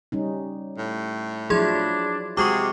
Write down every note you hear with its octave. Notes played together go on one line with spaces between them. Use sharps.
G3 C#4 D#4
A2
F3 F#3 D4 E4 G#4 C6 G#6
C3 G#3 F#4 G#4 C#6 D6